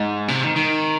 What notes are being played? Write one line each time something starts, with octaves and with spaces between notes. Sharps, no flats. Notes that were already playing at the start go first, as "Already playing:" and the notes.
Already playing: G#2
C3
D#3
D#3